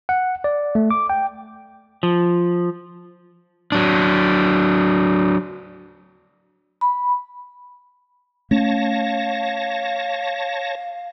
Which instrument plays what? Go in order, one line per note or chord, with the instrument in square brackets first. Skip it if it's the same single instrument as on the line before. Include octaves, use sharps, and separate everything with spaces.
[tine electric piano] F#5
D5
A3
D6
G5
[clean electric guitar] F3
[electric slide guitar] F#3 D4
[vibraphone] B5
[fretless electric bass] A3 C#4 [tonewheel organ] C#5 A5 A#6 [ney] F5